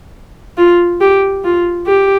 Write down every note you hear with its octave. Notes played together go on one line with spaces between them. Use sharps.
F4
G4
F4
G4